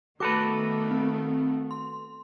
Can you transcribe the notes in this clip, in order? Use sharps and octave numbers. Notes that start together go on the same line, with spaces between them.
D#3 A3 B3 F#4 A4 B4 D6
C4
C6